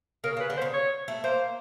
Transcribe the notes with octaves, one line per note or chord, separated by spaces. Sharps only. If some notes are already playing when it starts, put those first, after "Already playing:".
C#3 A#4
C#3 B4
D3
C5
C#3
C#5
A3
A#3 C5